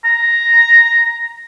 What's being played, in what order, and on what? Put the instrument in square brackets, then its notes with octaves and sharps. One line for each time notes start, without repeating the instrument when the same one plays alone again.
[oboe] A#5